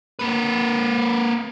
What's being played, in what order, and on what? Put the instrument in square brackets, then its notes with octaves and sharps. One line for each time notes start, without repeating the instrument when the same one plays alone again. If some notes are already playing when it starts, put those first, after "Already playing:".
[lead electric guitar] A#3 B4